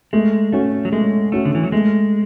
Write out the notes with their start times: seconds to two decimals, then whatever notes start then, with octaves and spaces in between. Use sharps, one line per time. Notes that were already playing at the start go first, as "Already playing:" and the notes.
0.13 G#3 A3
0.52 A3 C#4 F#4
0.85 F#3
0.92 G#3 A3
1.32 A3 C#4 F#4
1.45 D3
1.55 E3
1.64 F#3
1.72 G#3 A3